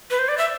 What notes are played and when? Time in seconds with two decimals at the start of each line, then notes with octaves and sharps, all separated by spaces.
0.11 B4
0.19 C5
0.28 D5
0.38 E5